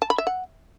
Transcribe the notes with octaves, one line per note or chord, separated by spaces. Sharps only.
A5
B5
E5
F#5